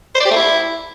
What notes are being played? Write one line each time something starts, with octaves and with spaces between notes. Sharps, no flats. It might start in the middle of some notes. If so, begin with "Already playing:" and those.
C5
D5
G4
A3
E4